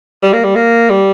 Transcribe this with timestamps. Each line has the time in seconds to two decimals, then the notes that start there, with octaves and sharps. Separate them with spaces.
0.23 G3
0.33 A#3
0.44 G3
0.55 A#3
0.90 G3